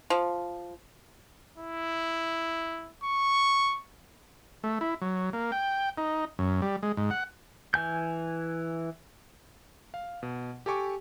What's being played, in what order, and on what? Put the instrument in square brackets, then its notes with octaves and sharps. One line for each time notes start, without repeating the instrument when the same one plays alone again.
[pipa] F3
[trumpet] E4
C#6
[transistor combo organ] A3
E4
F#3
A#3
G5
D#4
F#2
G3
G#3
G#2
F#5
[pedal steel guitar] E3 G#5 G6
[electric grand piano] F5
B2
G4 A4 G#5 C#6 D6